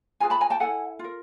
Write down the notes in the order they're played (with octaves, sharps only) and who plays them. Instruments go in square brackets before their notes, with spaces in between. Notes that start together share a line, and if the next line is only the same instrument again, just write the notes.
[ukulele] F4 G#4 B4 G#5 A#5
A5 B5
G#5 A#5
G5 A5
E4 A4 F#5 G#5
F4 A#4